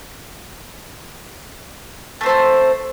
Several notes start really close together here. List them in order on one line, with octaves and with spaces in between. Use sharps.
A3 C4 C5 A4